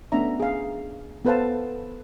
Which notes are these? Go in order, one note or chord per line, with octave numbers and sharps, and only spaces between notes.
A3 B3 C#4 D4 E5 A#5
G#4 F5
B3 A4 B4 C5 F5 A5